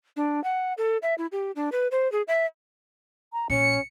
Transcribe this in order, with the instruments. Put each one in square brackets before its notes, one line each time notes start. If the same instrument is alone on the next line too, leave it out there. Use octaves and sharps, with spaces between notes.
[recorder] D4
F#5
A4
E5
E4
G4
D4
B4
C5
G#4
E5
[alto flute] A#5
[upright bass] A#1 [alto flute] C#4 [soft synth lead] C#7